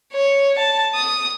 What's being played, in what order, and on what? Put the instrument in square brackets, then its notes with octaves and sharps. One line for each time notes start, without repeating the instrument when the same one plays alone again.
[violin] C#5
A5
D#6